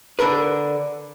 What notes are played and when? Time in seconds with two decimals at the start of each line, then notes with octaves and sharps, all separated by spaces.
0.19 D3 D4 A#4 B4